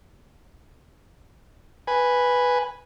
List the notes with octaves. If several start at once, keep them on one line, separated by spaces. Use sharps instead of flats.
B4 G#5